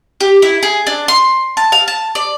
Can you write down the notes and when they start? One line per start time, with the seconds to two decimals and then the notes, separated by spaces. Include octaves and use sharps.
0.21 G4
0.42 E4
0.63 G#4
0.87 D4
1.08 C6
1.57 A5
1.72 F5
1.88 A5
2.15 D5